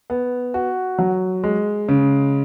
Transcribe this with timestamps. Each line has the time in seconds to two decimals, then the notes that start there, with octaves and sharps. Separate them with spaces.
0.10 B3
0.54 F#4
0.99 F#3
1.44 G#3
1.89 C#3